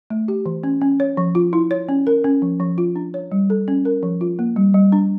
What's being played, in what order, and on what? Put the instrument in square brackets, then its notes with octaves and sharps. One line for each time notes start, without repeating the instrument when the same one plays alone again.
[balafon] A3
G4
E3
C#4
C#4
C#5
F3
F4
E4
C#5
C#4
A#4
C#4
F3
F3
F4
D4
C#5
G3
A4
C#4
A#4
F3
F4
A#3
G3
G3
D4